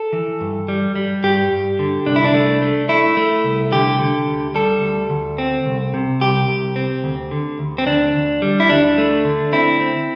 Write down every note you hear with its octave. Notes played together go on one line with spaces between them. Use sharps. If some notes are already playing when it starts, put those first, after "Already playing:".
Already playing: A4
E3
G2
G3
G3
G2 G4
G2
D3
C2 D4
E4
D4
A3
A3
A3 E4
A3
C2
D3 G4
D3
D2
G3 A4
D2
D2
C4
C2
C3
C2 G4
C2
C4
D2
D3
D2
C4
D2 D4
D2
G3
E4
D2 D4
A3
D3
C4 E4
C4